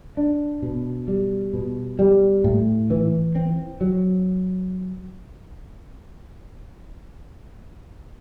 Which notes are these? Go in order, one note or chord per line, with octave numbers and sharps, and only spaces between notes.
D4
B2
G3
B2
G3
A2
E3
C4
F#3